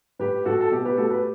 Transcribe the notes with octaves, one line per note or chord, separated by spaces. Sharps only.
A2 G4 B4
A2 F#4 A4
A4
B2 G4
G4 B4
A3 F#4 A4
G4 B4